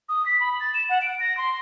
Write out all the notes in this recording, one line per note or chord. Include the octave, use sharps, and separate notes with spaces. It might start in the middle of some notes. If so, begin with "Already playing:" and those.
D#6
B6
B5
A6
E7
F#5
D7
A#6
C6